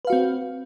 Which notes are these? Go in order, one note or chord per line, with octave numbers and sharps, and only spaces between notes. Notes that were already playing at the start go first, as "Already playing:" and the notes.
C4 F#4 B4 F5